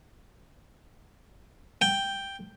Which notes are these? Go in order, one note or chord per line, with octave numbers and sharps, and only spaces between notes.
G5